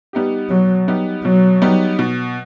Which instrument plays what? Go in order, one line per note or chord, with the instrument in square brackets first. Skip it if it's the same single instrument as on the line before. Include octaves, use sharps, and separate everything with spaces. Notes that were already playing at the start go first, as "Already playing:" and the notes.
[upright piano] G3 B3 D#4 G4
[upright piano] B2 [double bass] F#3
[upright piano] G3 B3 D#4 G4
[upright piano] B2 [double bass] F#3
[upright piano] G3 B3 D#4 G4
B2